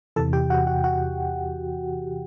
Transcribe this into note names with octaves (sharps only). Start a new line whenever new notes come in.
E2 C3 E3 A4 A5
G4 G5
F#4 F#5
F#4 F#5
F#4 F#5